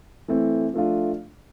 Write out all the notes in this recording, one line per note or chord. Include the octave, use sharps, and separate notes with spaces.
E3 A3 C4
F3 A3 D4 F4